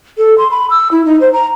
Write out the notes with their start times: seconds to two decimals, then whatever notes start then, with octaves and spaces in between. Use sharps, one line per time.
0.18 A4
0.38 C6
0.51 B5
0.70 E6
0.91 E4
1.05 D#4
1.21 C5
1.33 A#5